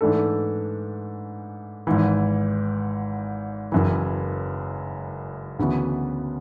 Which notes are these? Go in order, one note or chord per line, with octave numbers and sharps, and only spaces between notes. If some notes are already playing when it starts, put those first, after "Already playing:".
G#2 E3 A3 D4 A4
G#1 G#2 E3
F#1 F#2 E3
D2 C#3 E3 B3 F#4